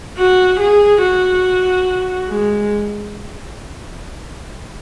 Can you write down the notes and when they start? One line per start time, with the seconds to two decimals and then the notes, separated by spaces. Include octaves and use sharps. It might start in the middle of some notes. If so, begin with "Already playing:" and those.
0.18 F#4
0.60 G#4
1.02 F#4
2.28 G#3